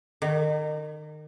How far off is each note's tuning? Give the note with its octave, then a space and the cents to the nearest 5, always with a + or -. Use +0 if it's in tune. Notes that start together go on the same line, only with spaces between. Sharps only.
D#3 -30